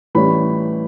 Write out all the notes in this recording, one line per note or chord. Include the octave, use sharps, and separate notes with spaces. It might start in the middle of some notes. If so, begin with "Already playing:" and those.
A2 E3 G3 C#4 B5